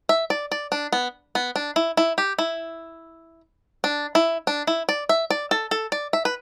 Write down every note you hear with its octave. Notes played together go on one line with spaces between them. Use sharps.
E5
D5
D5
D4
B3
B3
D4
E4
E4
G4
E4
D4
E4
D4
E4
D5
E5
D5
A4
A4
D5
E5
B4